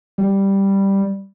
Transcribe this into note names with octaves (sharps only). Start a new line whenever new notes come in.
G3